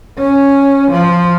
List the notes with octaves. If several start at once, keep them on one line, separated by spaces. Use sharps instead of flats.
C#4
F3